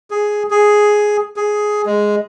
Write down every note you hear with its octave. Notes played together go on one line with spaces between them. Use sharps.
G#4
G#4
G#4
G#3